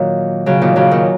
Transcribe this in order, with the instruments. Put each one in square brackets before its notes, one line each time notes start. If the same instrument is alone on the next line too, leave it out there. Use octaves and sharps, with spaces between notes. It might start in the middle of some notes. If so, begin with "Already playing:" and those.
Already playing: [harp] A#2 D#3 F#3
C#3 F#3
A#2 D#3
C#3 F#3
A#2 D#3